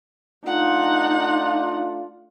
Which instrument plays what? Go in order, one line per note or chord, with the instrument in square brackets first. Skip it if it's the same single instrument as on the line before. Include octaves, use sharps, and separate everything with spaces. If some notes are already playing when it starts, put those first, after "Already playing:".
[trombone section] A3 D4 F4 [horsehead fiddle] D#4 [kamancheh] F#5